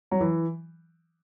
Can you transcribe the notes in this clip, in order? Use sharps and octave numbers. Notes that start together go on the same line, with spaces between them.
F#3
E3